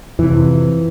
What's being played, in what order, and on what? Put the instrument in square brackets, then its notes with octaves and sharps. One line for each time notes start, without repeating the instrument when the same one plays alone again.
[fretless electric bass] F2 C3 E3